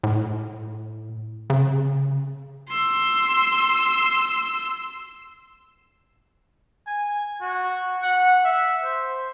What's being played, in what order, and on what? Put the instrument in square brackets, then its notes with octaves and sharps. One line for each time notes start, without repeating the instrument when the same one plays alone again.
[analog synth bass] A2
C#3
[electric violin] C6 E6
[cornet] G#5
F#4
F#5
E5
C5